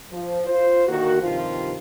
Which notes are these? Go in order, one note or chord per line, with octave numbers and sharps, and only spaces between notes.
F3
F4 C5
D3 D#3 A#3 F#4
G2 C3 D#3 F3 F4